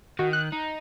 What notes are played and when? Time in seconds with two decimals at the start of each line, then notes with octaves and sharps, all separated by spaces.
0.19 D#3 F#4
0.33 F#6
0.52 D#4